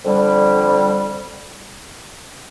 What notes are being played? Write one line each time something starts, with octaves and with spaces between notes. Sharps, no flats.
F2 D3 G3